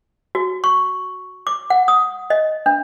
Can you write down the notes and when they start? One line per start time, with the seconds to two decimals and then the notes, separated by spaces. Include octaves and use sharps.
0.35 F#4
0.64 C#6
1.47 D6
1.70 F#5
1.88 D#6
2.30 D#5
2.66 D4